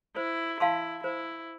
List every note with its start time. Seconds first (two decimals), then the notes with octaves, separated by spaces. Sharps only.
0.16 E4 C5
0.60 E4 F5 A5 C6
1.04 E4 C5